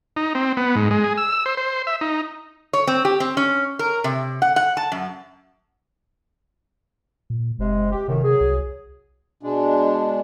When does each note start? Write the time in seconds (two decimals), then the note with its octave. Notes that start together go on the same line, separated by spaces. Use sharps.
0.16 D#4
0.35 C4
0.57 B3
0.76 G#2
0.91 G#3
1.04 G#4
1.18 E6
1.46 C5
1.57 C5
1.87 E5
2.01 D#4
2.73 C#5
2.87 C4
3.05 G4
3.20 C4
3.37 C#4
3.79 A#4
4.04 C3
4.42 F#5
4.56 F#5
4.77 A5
4.92 F#2
7.30 A#2
7.59 F#1 C3 G#3
7.92 G4
8.08 F#2 A2 C3 D#3
8.23 F#3 G#4
8.41 C2
9.43 B2 G#3 D4